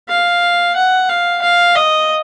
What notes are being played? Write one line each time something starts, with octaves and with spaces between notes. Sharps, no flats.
F5
F#5
F5
F5
D#5